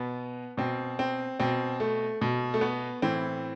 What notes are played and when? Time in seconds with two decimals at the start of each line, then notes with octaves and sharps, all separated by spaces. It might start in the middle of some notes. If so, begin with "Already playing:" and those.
Already playing: B2 B3
0.57 B2 C4
0.99 C4
1.40 B2 C4
1.80 A3
2.21 B2
2.54 A3
2.61 B3
3.02 A2 E3 C4